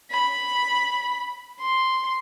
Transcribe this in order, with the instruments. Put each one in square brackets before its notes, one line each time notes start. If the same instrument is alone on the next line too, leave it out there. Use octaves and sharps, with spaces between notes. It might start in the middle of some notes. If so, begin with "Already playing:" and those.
[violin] B5
C6